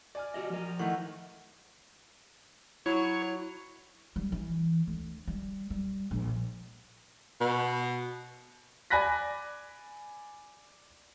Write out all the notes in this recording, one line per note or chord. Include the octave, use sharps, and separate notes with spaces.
D5 G#5 F6
F#4 G4 D#5
F3 A#4
D#3 E3 A3 F#5
F#3 E4 C#5
G3
E3
D2
G3
G3
A#1
B2
D5 G#5 B5 F#6 A#6 B6